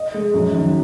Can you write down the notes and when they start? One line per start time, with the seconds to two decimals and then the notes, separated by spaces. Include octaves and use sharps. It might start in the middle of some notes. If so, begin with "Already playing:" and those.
Already playing: D#5
0.14 G#3
0.34 F#2
0.53 D#3 F#3